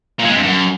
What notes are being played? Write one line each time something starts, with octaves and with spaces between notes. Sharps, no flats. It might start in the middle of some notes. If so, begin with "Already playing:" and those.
A#2
G#3
C3
G2
F#2